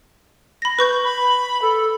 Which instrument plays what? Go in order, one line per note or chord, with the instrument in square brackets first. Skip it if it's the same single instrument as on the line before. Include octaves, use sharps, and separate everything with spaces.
[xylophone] B5 A#6
B4 C#6 G6
[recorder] B5
A4